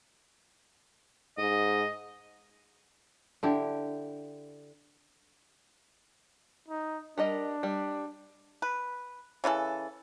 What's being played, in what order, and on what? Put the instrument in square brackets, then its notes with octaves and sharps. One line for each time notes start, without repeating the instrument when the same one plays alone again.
[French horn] G#2 [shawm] D#5
[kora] D3 E4 G4
[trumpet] D#4
[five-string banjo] G3 A#4 D#5 [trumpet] D4
[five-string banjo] G3
[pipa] B4
C#3 E3 F4 A4